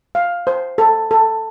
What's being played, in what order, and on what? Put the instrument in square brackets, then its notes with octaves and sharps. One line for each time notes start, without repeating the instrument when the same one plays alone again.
[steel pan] F5
C5
A4
A4